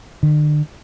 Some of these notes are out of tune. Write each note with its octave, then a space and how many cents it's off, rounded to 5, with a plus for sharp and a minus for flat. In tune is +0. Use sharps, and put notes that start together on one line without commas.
D3 +40